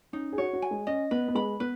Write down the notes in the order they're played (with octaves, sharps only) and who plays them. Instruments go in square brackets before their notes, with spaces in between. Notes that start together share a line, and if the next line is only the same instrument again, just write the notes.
[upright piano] C#4 [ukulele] D#4
[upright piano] G#4
[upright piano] F#4 [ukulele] C#5
[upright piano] F#4
[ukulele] G#5
[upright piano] G#3
[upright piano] C#4 [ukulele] D#5
[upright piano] B3 [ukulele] B4
[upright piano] B3
[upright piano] G#3 [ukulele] B5
[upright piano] B3 [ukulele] B4